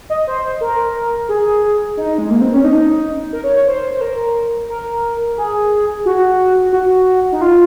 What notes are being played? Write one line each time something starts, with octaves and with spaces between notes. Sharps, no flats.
D#5
C5
A#4
G#4
D#4
G#3
A#3
C4
C#4
D#4
A#4
C#5
C#5
C5
C5
A#4
A#4
G#4
F#4
F#4
D#4
F4